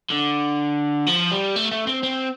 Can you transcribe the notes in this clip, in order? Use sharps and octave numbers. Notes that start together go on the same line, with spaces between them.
D3
F3
G3
A3
A3
C4
C4